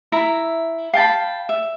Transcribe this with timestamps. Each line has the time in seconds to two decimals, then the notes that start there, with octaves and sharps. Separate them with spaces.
0.12 E4 E5 A#5
0.93 F5 G5 A5 B5
1.49 E5